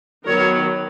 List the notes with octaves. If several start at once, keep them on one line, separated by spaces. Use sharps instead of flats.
D#3 F#3 B3 A#4 C#5